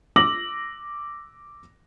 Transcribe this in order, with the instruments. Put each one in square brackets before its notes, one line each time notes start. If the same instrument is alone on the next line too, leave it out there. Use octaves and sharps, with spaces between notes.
[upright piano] D6 E6 A#6 F#7